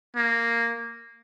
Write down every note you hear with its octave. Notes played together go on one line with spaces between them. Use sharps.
A#3